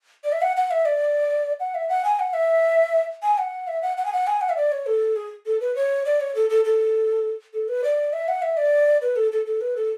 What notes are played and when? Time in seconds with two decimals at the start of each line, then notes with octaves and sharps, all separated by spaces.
0.24 D5
0.32 E5
0.42 F#5
0.57 F#5
0.71 E5
0.85 D5
1.60 F#5
1.75 E5
1.89 F#5
2.04 G#5
2.19 F#5
2.33 E5
3.23 G#5
3.38 F#5
3.68 E5
3.82 F#5
3.97 F#5
4.05 G#5
4.13 F#5
4.27 G#5
4.41 F#5
4.49 E5
4.57 D5
4.72 C#5
4.86 A4
5.16 G#4
5.46 A4
5.60 B4
5.76 C#5
6.05 D5
6.20 C#5
6.35 A4
6.50 A4
6.65 A4
7.53 A4
7.68 B4
7.84 D5
8.13 E5
8.28 F#5
8.42 E5
8.57 D5
9.01 B4
9.16 A4
9.32 A4
9.46 A4
9.61 B4
9.76 A4